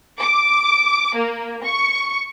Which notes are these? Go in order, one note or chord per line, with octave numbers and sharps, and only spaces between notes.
D6
A#3
C#6